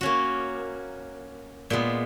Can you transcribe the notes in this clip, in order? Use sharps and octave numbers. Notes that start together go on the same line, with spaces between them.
A#3 C#4 F#4
A#2 G#3 B3